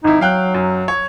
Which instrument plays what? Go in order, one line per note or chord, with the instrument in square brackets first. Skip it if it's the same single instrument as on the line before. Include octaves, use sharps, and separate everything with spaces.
[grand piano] G#1 E4 [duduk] D#4
[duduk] F#3 [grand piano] F5 G5 F#6
[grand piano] F#2
C#5